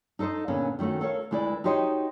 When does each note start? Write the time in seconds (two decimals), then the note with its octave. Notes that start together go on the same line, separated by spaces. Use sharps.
0.19 D#4 A4 B4 C5 D#5
0.48 A#2 D3 B3 C#4 G#4
0.79 D#3 G3 A3 C#4 F#4
1.01 A4 A#4 C#5 F5
1.31 D2 G#3 E4 B4 D5
1.64 D#4 F#4 G4 C5 C#5 D#5